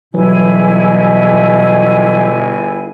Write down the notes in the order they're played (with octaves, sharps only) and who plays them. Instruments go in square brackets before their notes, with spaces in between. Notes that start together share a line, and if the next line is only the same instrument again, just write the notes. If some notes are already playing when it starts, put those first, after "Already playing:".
[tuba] G1 [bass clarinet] B2 [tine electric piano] E3 F#3 [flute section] E4 G#4 G#5